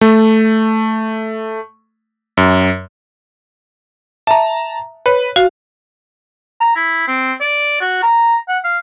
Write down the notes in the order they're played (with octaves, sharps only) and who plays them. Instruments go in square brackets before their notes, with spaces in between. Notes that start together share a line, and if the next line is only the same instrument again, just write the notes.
[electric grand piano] A3
F#2
[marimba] E5 [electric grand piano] A5 A#5
[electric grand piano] B4 [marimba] C#5
[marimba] F#4 [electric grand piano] F5
[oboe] A#5
E4
C4
D5
F#4
A#5
F#5
F5